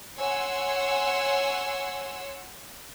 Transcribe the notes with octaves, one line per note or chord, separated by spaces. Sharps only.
C#5 F#5 G#5 C6 E6